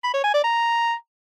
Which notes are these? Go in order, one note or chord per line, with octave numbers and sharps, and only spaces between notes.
B5
C#5
G#5
D5
A#5